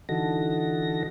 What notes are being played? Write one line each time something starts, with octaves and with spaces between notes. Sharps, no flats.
D3 E3 D#4 F#4 A4 A#6